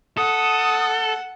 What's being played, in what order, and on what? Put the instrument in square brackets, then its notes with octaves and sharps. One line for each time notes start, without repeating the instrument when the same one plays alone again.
[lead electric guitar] A4 [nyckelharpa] F#5 [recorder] D#6